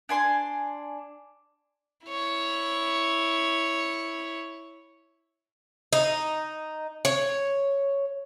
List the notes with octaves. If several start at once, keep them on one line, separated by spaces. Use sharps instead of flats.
D4 G#5 C6
E4 C#5
D#4
C#5